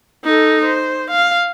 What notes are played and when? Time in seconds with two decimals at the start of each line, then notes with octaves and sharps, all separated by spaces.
0.24 D#4 A4
0.65 C5
1.11 F5